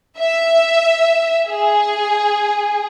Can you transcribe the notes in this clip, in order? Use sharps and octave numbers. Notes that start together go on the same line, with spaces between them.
E5
G#4